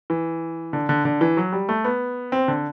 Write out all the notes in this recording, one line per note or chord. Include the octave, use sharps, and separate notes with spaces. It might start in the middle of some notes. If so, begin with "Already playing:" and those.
E3
D3
D3
D3
E3
F#3
G3
A3
B3
C4
D3